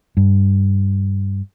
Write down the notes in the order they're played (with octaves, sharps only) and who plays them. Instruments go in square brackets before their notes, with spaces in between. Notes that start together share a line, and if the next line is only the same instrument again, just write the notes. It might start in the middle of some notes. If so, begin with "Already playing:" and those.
[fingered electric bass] G2